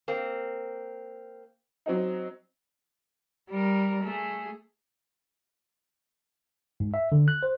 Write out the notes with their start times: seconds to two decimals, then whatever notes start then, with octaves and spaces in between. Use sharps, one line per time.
0.08 A#3 C4
1.86 F#3 C4 D#4
3.50 G3 A#4
4.03 A3 G#4
6.80 G#2
6.94 E5
7.12 D3
7.28 F#6
7.43 C5